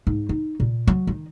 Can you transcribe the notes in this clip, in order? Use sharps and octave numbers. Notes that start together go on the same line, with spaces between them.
G#2
D#4
A#2
F#3
D#3